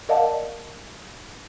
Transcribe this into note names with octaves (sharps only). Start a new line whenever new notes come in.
A#4 D5 D#5 F5 F#5 A5